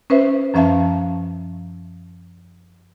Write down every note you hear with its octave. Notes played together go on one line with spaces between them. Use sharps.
C#4 B4 C5 E5
F#2 F3 C#4 E5 F5 A5